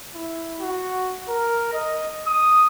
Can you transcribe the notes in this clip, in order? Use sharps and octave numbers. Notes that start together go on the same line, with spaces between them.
E4
F#4
A#4
D#5
D#6